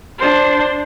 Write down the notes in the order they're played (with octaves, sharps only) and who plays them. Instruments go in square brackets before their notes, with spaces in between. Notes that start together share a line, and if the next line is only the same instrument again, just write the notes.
[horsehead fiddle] D4 C5